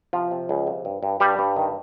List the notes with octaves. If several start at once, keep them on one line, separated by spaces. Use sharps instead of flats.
C3 F3 F4
C3
C#2
C3
G2
G2
G2 G3 G4
G2
D#3